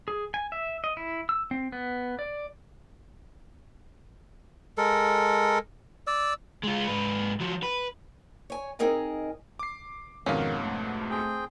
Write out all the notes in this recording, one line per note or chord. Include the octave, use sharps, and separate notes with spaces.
G#4
G#5
E5
D#5
E4
E6
C4
B3
D5
G#3 A4 A#4
D5 E6
G#3 F4
G#2 B4
F3 F#3
B4
C#5 G#5
C4 D#4 G#4 A#4 D#5 G#5
D6 C7
F2 G#2 B2 D#3 C#4 F5 F#5
A3
C4 G#4 G5